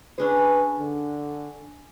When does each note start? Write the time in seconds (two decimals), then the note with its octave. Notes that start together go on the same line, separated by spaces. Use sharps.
0.18 C#4 D4 G#4 B4
0.78 D3